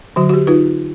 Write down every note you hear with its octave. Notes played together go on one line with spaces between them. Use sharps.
D3 F#3 F#4
F#4 G4
D#4 F4 B4